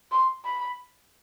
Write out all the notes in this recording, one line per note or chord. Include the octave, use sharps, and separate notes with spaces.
C6
B5